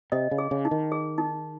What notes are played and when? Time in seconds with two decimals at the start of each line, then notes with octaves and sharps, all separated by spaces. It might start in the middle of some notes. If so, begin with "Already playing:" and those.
0.12 C3 D#5
0.31 C#3
0.38 G#4
0.51 C#3
0.65 D#4
0.71 D#3
0.92 G#4
1.18 D#4